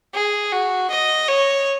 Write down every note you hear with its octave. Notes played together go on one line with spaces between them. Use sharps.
G#4
F#4
D#5
C#5